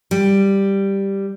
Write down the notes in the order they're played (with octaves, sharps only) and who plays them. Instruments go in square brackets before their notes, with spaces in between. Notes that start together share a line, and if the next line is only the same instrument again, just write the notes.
[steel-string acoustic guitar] G3